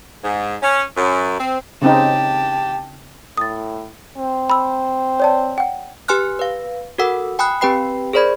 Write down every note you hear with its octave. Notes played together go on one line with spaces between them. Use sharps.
G#2
C#4
F#2
C4
C#3 C4 D#4 G4 A5
A2 D#6 A6
C4
B5 E6
C#5 D5 A5
F#5 G5
G4 B4 G#5 C6 F6 F#6
B4 F5
F#4 A4 A#4 F#5 E6
G5 G#5 B5 D#6 F#6
C4 G4 B4 G5 B5 C7
G#4 A#4 C5 D5 B5 G#6